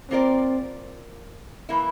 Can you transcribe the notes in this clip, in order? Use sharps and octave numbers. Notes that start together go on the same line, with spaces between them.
A#3 C4 F4 A#4 D5
A2 E3 A#3 E4